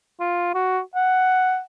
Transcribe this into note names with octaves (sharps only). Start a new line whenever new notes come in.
F4
F#4
F#5